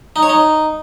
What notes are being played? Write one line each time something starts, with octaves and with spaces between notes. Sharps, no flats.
D#4
C#5
D#4